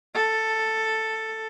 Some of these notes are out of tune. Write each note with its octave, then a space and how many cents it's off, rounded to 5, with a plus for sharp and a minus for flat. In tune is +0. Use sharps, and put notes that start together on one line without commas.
A4 +5